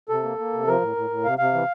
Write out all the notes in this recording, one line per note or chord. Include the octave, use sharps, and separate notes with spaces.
C3 A4
A#3
A#3
C3
F3 A#4
A2
A2
A2
C3 F5
C3 F5
E3